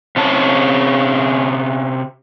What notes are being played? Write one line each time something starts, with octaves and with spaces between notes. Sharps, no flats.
C3 C#4 A5